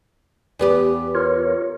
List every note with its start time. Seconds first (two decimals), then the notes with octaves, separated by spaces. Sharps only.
0.59 E2 B3 G4
1.15 F4 A#4 C#5